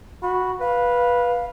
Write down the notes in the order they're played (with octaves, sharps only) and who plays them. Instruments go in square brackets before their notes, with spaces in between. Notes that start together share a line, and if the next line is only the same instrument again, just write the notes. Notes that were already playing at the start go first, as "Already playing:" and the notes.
[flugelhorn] F#4 [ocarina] B5
[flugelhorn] B4 [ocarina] F5